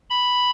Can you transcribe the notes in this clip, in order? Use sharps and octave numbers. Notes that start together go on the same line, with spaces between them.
B5